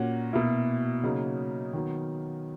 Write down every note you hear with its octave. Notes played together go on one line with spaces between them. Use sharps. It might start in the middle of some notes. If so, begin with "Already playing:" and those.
Already playing: A#2 A#3 C#4 F#4
B2 A#3 E4
C#3 F#3 A#3 D#4
D#3 F#3 B3